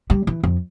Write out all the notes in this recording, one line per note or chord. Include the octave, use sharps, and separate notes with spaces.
G3
E3
F2